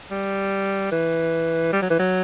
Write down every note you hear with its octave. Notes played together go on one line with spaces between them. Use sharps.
G3
E3
G3
F#3
E3
F#3